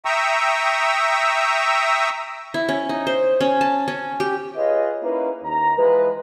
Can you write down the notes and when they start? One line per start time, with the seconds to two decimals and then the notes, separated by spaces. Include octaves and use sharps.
0.05 E5 G5 A#5 C#6 D#6 E6
2.54 E4
2.69 C#4
2.89 D#4
3.07 C5
3.40 C#4
3.61 A5
3.88 C#4
4.20 G4
4.56 F4 G#4 B4 C#5 D#5
5.03 A#3 C#4 D#4 E4 B4
5.44 D#2 A#5
5.77 E3 F3 G#3 B4